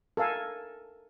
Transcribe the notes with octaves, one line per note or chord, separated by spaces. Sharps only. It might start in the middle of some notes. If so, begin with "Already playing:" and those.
A4 A#4 F5 G#5